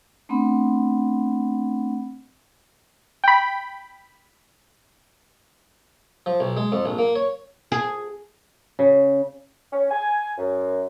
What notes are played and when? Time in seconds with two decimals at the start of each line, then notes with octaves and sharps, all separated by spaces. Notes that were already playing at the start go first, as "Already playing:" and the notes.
0.29 A3 B3 C4 D4 F#5 B5
3.24 G5 B5
6.26 F3
6.40 B1
6.57 G#3
6.72 F2
6.85 A#1
6.98 A#3
7.16 C#5
7.72 G#4
8.79 C#3
9.72 C#4
9.90 G#5
10.38 F#2